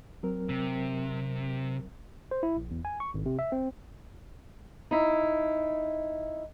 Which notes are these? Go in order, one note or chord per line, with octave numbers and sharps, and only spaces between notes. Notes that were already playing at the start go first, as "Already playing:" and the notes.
F#3 C4 A#4
C3
C5
E4
A#1
E2
G#5
C#6
G#1
C3
E5
C4
D#4 E4